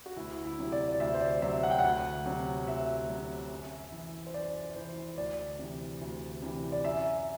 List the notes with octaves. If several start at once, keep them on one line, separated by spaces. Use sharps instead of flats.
F#4
D2 E4
E4
C3 F#3
D5
D5
D2 E5
C5
D5
C3 F#3 E5
F#5
G5
D2 F#5
C3 F#3
D2 E5
C3 F#3
F#2
E3
C5
F#2 D5
E3 C5
D2 D5
C3 E3
D2
C3 E3
D5
F#2 E5